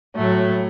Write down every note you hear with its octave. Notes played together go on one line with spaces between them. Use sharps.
A2 F#3 A3